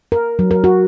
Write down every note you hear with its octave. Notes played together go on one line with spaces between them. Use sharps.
A#4
F#3
A#4
F#4